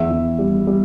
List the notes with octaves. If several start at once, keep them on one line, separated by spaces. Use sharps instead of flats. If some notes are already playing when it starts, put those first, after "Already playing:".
Already playing: E2 E5
E2
G3
G3